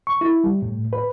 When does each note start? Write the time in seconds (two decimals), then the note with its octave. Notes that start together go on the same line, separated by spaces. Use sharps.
0.07 C#6
0.21 E4
0.44 G3
0.62 A2
0.93 B4